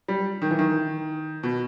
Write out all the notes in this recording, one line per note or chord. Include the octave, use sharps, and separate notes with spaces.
G3
D#3
E3
D#3
B2